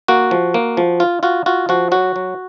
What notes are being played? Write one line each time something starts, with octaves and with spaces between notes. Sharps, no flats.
A#3 F#4
F3
A#3
F3
F4
F4 F#4
F4 F#4
F3 F#4
F#3 F#4
F#3